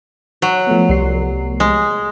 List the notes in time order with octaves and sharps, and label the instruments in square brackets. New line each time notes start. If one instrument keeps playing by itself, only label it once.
[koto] F#3
[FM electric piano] F3 A3 B3
[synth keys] C2 C7
[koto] G#3